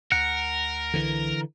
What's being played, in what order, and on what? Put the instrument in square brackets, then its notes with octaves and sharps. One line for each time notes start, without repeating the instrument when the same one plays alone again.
[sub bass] D2 [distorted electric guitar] A#4 [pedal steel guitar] F#5
[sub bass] C2 [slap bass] D3 E3